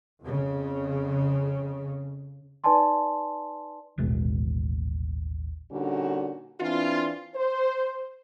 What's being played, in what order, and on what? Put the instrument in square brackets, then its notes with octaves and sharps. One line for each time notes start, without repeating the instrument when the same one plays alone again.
[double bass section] F2 C#3
[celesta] D#4 B4 D5 G#5 A5 C6
[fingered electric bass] D#1 A1 B2 G#3
[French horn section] A#2 D3 G3 C#4 D#4 F#4
E3 C4 D4 F4
C5